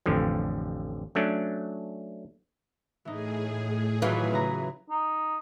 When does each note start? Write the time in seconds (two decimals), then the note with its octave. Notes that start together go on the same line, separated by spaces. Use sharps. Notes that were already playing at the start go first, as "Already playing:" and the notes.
0.06 A1 F2 D3 F3
1.15 F#3 A3 C#4 D4
3.05 A2 E3 D#4 G#4
4.02 D#3 E3 F#3 F4
4.31 C#3 B4 A#5
4.90 D#4